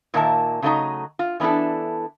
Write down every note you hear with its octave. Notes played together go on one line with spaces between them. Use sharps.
A#2 D#3 A#3 A#4 E5 A5
C#3 F#3 A3 D#4 D#5 A#5
F4
E3 B3 D4 E4 A4